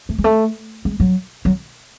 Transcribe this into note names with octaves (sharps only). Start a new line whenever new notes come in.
A3
G#3
A3
G#3
F#3
F#3